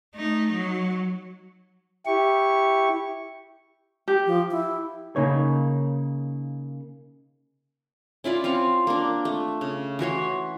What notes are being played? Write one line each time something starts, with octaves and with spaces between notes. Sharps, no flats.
A3 D#4
F#3
E4 G4 C#6
G4
F3
E4
C#3 A#3 D#4 C#5
C#4 E4 F4 D5
C4 F4 F5 C#6
A#3 D4
A3
C#3
E3 F#4 C#5 C6